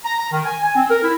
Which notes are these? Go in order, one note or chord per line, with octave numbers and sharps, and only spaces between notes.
A#5
A#5
D#3
G#5
G#5
C4
A#4
E4